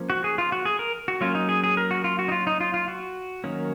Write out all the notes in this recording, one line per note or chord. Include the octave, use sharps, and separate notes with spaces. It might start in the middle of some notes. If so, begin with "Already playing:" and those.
Already playing: F3 A#3 C#4
F#4
G#4
F4
F#4
G#4
A#4
F#4
F#3 A#3 C#4 F4
D#4
G#4
G#4
A#4
F#4
F4
F#4
D#4
F4
D#4
F4
F4
F#4
D#3 F#3 A#3 C#4